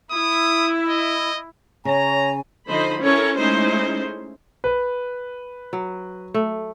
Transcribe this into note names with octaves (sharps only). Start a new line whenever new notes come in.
E4 D#6
D#5
C#3 C#5 G#5 A#5
D3 F3 D#4 C5 D#5 B5
C#4 E4 A4 A#4 C#5
G#3 A3 C#4 D#4 E4 C5
B4
F#3
A3